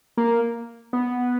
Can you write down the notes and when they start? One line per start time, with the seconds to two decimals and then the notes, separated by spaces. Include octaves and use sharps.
0.17 A#3
0.93 B3